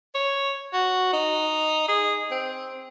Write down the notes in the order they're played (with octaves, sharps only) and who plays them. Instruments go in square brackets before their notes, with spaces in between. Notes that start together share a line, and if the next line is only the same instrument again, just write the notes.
[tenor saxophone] C#5
F#4
D#4
G#4
C4